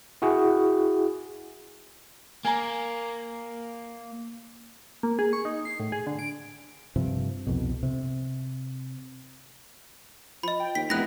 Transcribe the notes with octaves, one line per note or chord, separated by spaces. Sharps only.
E4 F#4 G#4
A#3 G#5 A#5
A#3
G#4
C#6
D#4
C7
A2
G#4
D3
D7
G2 C3 F3
C2 F2 B2
C3
F3 D#5 B5
G5
D#2 B6
F1 B3 D#4 E4 F#6 A#6